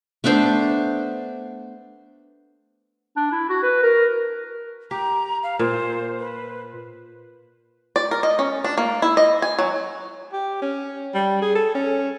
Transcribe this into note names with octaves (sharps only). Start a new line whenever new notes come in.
A3 B3 D4 C5
D4
E4
F#4
B4
A#4
G4 A#5
F5
A#2 C5
B4
D5
A#4
D#5
C#4
D4
A#3
E4
D#5
G#5
F#3
G4
C#4
G3
G#4
A4
C#4